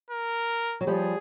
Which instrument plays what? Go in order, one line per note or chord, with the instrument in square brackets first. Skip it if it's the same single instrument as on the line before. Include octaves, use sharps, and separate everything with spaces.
[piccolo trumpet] A#4
[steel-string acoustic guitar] F#3
[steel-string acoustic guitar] F3 G3 [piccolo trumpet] G#4